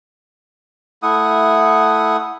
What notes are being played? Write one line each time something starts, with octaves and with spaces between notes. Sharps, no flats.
A3 E4 F#5 D#6